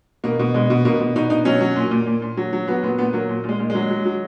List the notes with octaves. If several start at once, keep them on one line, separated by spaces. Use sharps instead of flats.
B2 A#3
B2
B2 G#3
B2
B2 A#3
B2
B2 D#4
B2 D#4
F#3 C#4
F#3
A#2
A#2
A#2
A#2
F#3
F#3
F#3 B3
A#2 B3
A#2 B3
F#3 A#3
A#2
A#2
G#3
A#2
G#3
F#3
F#3
F#3